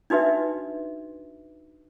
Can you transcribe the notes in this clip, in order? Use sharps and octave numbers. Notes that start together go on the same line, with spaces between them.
D4 D#4 F#4 B4 E5